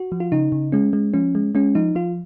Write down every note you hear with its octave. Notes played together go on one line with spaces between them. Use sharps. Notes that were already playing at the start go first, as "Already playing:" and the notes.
Already playing: F#4
F3
F4
C#3 D#4
C#3
G#3 C#4
G#3
F3 C#4
G#3
G#3 C#4
F3 D#4
F3 F4